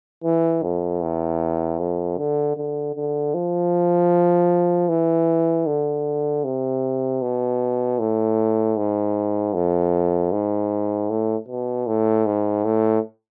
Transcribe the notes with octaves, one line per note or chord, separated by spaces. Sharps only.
E3
F2
E2
F2
D3
D3
D3
F3
E3
D3
C3
B2
A2
G#2
F2
G#2
A2
B2
A2
G#2
A2